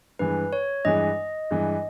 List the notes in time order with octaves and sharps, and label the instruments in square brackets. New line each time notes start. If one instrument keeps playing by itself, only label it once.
[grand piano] G2 E3 G#3 [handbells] B4
[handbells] C#5
[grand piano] G2 E3 G#3 [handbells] D#5
[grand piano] G2 E3 G#3